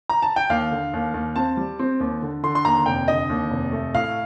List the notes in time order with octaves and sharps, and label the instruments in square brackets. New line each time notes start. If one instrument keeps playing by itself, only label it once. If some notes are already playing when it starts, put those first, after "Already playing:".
[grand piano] A#5
A5
G5
D#2 F5
D3
D#2
D#2
C4 A5
G3
C4
D#2
D3
D3 C6
C6
D#2 A#5
F1 G5
D3 D#5
D#2
F1
A3
A2 F5